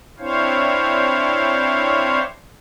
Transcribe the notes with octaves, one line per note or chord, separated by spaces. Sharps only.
C4 D4 E4 C5 C#5 F5